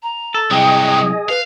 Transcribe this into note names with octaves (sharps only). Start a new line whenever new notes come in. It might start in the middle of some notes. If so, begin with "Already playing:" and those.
A#5
A4
C2 C3 F#3 G#4 D#5 G5
B4 F5